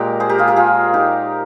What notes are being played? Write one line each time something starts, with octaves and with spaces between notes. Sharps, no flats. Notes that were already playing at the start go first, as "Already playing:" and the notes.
Already playing: A#2 G#3 G4 A#4
G#4 C5
G4 A#4
F4 G#4
G4 A#4
F4 G#4
D#4 G4